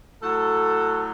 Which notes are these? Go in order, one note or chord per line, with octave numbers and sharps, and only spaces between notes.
A2 F#3 F#4 A4